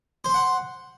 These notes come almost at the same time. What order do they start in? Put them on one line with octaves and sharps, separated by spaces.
C5 C6 F#5